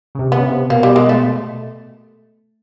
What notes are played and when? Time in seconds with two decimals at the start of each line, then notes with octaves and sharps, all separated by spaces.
0.15 C#3
0.19 C3
0.32 B3
0.40 C#3
0.45 C3
0.70 B2 A#3
0.83 G3
0.96 G#3
1.09 A3